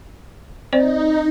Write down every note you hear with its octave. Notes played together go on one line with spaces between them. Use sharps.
C4 D#4 C5 D5